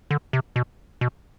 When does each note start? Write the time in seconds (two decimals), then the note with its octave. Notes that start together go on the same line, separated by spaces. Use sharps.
0.11 D3
0.33 C3
0.56 B2
1.01 B2